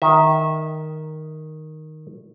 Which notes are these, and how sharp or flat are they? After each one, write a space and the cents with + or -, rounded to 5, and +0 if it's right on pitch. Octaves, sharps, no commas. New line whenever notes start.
D#3 +0 E5 -20